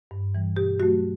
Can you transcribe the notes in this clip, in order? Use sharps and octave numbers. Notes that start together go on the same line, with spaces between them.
G2
E3 G3
B2 G4
F#3 A3 F#4